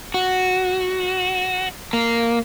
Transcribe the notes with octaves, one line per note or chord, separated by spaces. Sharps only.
F#4
A#3